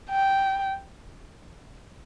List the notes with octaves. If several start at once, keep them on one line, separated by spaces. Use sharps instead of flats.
G5